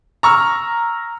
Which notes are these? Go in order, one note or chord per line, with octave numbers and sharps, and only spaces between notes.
A#5 C#6 E6 F6